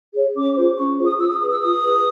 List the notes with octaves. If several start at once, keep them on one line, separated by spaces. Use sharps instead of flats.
G#4 C#5
C#4 D6
F4 G#4 C5
C#4 C#6
F4 G#4 C5
D#6
F4 E6
D#6
G#4 B4 D#6
E6
F4 D#6
G#4 B4